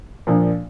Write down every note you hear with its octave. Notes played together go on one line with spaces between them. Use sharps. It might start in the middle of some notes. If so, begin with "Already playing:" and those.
A#2 F3 A#3 D4